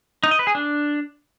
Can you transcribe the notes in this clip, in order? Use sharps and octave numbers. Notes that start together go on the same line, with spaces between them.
D#4
D#5
B4
G#4
D4